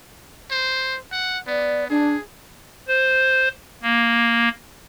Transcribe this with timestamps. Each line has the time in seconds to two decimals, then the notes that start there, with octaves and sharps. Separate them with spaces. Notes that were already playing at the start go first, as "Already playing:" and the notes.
0.51 C5
1.12 F#5
1.47 B3 D5
1.90 D4 G#4
2.88 C5
3.83 A#3